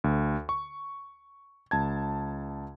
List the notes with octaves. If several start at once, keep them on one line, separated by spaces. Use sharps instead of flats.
D2
C#6
C#2 A5 G#6